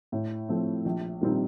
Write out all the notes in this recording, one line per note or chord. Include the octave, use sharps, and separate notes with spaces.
A2
F3 A3 C4
A#1
A#2 G3 C4 D#4